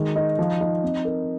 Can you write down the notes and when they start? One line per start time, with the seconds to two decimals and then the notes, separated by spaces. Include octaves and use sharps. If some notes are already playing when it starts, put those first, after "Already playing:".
Already playing: D#3 G#3
0.16 D#4
0.39 F3
0.61 D#4
0.83 C4
1.05 A#4